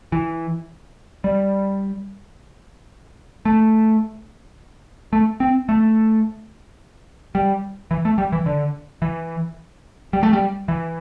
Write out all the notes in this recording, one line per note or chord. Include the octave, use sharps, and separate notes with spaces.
E3
G3
A3
A3
C4
A3
G3
E3
A3
G3
E3
D3
E3
G3
A3
G3
E3